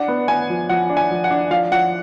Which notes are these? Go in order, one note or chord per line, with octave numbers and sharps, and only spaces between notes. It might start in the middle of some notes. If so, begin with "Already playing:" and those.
Already playing: D4 F#5
B3
B3 G#5
F3
F3 F#5
D4
G#5
F3
F#5
D4
F3 F5
F3 F#5